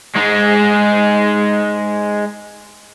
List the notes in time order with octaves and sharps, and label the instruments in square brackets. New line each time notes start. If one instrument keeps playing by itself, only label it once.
[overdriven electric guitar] G#3 D#4